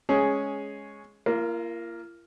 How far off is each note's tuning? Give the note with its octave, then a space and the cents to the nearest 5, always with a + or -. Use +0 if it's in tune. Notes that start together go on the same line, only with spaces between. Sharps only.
G#3 +0 C#4 +0 G#4 +10
A#3 +0 F4 -45